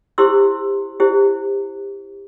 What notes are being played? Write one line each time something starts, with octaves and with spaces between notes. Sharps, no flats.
E4 G4 C5 C6 E6
E4 G4 C5